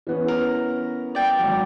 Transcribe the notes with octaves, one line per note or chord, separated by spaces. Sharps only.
E3 B3 C#4
A#4
D5 G5
G#1 F#3